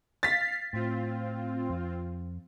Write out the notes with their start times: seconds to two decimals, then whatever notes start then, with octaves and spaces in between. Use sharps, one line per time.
0.23 F5 A6 B6 C7
0.73 A2 C4 F4
1.70 F2